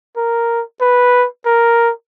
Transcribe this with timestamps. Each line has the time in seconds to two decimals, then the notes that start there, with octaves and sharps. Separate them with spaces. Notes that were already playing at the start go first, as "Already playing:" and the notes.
0.17 A#4
0.81 B4
1.46 A#4